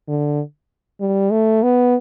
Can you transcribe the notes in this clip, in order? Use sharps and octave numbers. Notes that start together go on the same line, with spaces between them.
D3
G3
A3
B3